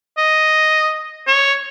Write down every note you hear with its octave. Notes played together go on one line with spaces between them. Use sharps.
D#5
C#5